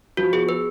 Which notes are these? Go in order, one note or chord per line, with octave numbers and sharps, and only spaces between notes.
F3 F#4
B3 G#4
B4